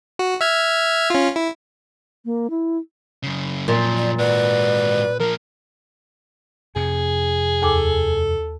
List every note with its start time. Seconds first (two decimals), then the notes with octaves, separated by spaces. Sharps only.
0.19 F#4
0.41 E5 F6 G#6
1.10 C#4 F4
1.36 E4
2.25 A#3
2.50 E4
3.23 F#2 C#3
3.68 F#2 A#2 F3
3.98 D5
4.19 G#2 F#4 B4 D5
5.20 F3 A#3 A#4
6.76 F2 C3 G#4
7.62 D#2 A4 G#5 D6